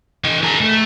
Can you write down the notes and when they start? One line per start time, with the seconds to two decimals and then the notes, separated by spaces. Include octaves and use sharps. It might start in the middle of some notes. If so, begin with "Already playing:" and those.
0.24 E3 D#5
0.43 G#4 A#4
0.61 A3